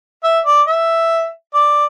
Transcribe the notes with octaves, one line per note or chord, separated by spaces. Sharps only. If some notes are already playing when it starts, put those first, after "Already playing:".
E5
D5
E5
D5